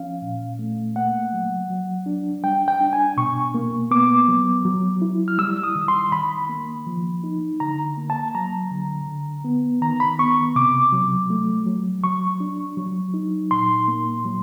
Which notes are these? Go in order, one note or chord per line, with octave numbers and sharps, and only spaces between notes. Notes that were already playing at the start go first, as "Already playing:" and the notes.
Already playing: F3 C#4 F5
A#2
A3
A#3 F#5
F#3
F#3
D4
G3 G5
G5
D4
G#5
B2 C#6
A#3
B3 D6
F#3
F#3
E4
F6
G3 E6
D#6
D#3
C6
D#3 B5
A#3
F3
D#4
D3 A#5
A#3
A5
F#3 A#5
D3
D3
B3
D#3 A#5
B5
B3 C#6
C3 D6
F#3
A3
F#3
F#3 C#6
D4
F#3
D#4
A#2 C6
A#3
F#3